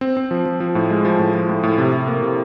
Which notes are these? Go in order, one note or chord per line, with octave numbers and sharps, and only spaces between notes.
C4
C4
F3
F3
F3
A2
G#3
F3
A2
F3
A2
A2
C3
C3
A#3
C3